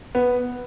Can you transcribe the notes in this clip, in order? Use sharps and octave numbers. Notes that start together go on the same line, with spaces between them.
B3